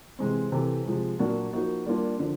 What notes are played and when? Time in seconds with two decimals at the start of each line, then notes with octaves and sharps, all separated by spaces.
0.19 C3 E3 G#3 C4
0.52 C3 E3 A3
0.86 C3 F3 G#3
1.19 A#2 F#3 A#3 D4 F#4
1.53 F3 A#3 D#4 F#4
1.86 G3 A#3 D4 F4
2.19 D3 F3